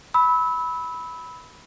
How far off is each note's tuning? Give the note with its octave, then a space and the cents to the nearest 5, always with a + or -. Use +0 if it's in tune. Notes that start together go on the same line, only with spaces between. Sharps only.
B5 +0 E6 -25